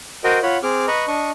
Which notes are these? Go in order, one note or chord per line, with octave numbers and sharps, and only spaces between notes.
F#4 A#4 C5 D#5 G5
F4 C#5 F#5 B5
C4 G#4 D6 F6
B4 D#5 A#5 B5 C#6
D4 D#5 C#6